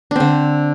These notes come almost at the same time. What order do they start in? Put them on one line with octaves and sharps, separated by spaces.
D4 C4 D3